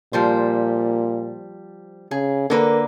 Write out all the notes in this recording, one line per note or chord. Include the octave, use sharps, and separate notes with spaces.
A#2 F3 G3 C5
C#3 G#4
D3 A#3 A#4 B4